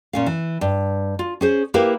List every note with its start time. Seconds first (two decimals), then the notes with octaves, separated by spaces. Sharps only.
0.13 A#2 C#4 F5
0.26 E3
0.61 G2
1.19 F4
1.41 C#4 G#4 C5
1.74 A#3 E4 G4 A#4 B4 F5